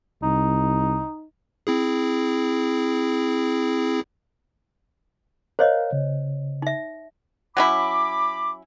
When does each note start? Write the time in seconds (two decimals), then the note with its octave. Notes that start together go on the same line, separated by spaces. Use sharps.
0.23 C2 D#4
1.67 C4 E4 G#4
5.59 A#4 C5 C#5 D#5 F5
5.93 C#3
6.62 D#4 E5
7.57 F#3 C#4 E4 B5 D6